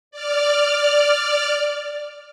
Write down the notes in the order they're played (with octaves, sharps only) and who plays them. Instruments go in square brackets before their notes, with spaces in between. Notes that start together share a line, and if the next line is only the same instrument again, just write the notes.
[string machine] D5 F6